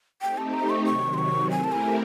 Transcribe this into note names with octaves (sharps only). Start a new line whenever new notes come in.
A3 C4 D#4 G4 G5
A5
A#5
C#6
C3 D#3 F#3 C#6
C6
C#6
A3 C4 E4 G4 A#4 G#5
A5
G#5